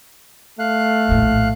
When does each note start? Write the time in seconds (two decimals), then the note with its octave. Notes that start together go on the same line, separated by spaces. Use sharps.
0.59 A3 F5 F#6
1.09 A#1 A2